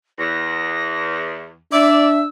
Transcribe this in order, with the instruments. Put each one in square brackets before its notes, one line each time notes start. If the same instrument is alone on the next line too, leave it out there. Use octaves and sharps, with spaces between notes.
[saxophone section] E2 [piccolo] A#6
[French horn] D4 [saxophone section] D5 [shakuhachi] E5 [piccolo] E6